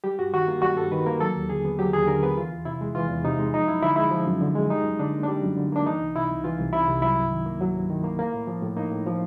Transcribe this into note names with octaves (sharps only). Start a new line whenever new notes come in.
G3 G4
G2 F#4
D#3 F#4
A#3 F4
G3 F#4
G2 A4
D#3 B4
A#3 A#4
F#3 A4
D#2
D3 G#4
B3
F#3 G4
D#2 G#4
D3 A#4
B3 B4
E3 F4
E2
C3 E4
G#3
E3 F4
E2
C3 D#4
G#3
F3 D#4
F#2 E4
D3 E4
G#3 E4
F3
F#2
D3
G#3
G3 D#4
F#2
D3 D4
A#3
G3 D4
F#2
D3
A#3 D4
E3 D#4
C2
C3 E4
C2
E3 F4
C2
C3 E4
C2
F#3 E4
G2
D#3
A#3
F#3
G2
D#3
A#3
A#3
A2
F3
A2
A#3 D#4
A2
F3